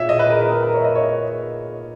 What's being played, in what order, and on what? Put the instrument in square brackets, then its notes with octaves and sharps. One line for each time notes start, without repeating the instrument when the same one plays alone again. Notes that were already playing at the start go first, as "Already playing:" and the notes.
Already playing: [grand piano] A#2 C#5 E5
D#5
B4
A#4
B4
A#4
B4
C#5
E5
D#5
C#5